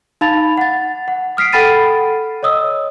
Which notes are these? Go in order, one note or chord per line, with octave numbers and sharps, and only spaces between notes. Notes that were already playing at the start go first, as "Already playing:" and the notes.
D#4 F5 A5 B5 A6 F7
F#5 A6
F#5
D#6 F6 B6 C7 D7
A4 F#5 G5 B5 A6 D#7
C#5 D#5 D#6 E6